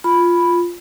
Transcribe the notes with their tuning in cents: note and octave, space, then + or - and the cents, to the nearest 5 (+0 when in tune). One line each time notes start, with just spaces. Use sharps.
F4 +0 B5 +0